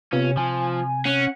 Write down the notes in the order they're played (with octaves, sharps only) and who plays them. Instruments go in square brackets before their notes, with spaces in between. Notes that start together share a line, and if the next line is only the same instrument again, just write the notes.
[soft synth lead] C3 [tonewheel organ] B3 F4 [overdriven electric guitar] C#4
[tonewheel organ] C3 [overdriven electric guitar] F3 [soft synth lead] G#5
[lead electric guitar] C#4 [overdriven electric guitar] F#5